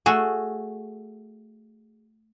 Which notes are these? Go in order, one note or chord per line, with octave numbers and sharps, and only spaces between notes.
A3 F#4 G#4